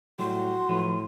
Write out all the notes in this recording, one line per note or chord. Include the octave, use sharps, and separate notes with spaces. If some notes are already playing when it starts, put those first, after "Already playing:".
A2 F#3 G3 F#4 G4 C6
A2 F3 F#3 B4